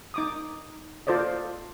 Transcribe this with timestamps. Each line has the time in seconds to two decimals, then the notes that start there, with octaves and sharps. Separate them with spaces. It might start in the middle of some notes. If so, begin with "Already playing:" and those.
0.14 D#4 D6 D#6
1.07 F4 A4 C5 D5 D#5